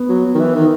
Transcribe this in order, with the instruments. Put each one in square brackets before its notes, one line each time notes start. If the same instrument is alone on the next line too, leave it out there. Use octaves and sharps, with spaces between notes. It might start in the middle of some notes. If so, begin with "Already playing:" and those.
Already playing: [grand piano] B3
[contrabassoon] F#3
D#3
E3
D#3